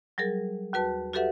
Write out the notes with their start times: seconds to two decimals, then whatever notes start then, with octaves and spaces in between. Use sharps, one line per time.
0.18 F#3 G3 G#4 A#4
0.73 D#2 F#4 B4 A5
1.13 F#4 G4 A4 B4 E5 F#5